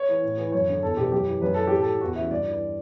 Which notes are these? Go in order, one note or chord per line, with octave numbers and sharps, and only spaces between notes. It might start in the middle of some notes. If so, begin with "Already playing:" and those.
Already playing: C#5
E3
A2
E3
F#2 C#5
D3
E2 A4
B2 G4
F#2 G4
E3
F#2 B4
E3 A4
A2 G4
A4
E3
E2 F#4
C#3 E3 E5
G2 D5
E3